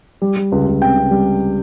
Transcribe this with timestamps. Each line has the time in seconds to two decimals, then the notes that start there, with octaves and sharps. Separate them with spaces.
0.22 G3
0.36 G3
0.52 C#2
0.67 C#2
0.81 C3 G5
0.97 C3
1.11 G3